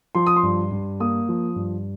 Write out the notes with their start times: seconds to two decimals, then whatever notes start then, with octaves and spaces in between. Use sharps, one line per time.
0.15 F3 C6
0.27 D#6
0.36 C6
0.43 G2
0.71 G2
1.00 A#3 D#6
1.29 F3
1.56 G2